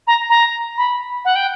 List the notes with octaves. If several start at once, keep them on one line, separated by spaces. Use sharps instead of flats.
A#5
A#5
B5
F#5
G5